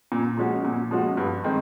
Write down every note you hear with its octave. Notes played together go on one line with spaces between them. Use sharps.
A#2
F3 G#3 C#4 F#4
A#2
F3 G#3 C#4 F#4
G2
D#3 G#3 C4